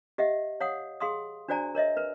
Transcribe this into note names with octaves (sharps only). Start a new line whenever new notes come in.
G4 D#5 E5 F#5
C#5 F5 F#5 D#6
G#4 F5 C6 D#6
D4 F#4 C5 D5 G#5 A#5
A#4 C#5 D#5 E5
A#4 B4